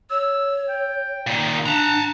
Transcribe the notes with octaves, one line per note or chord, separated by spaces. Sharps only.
C#5 E6
G5
A#2 D#3
D4 F#5 A5 A#5